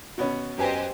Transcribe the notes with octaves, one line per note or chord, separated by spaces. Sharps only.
B2 B3 C#4
F#2 G4 B4 C5 D#5 G#5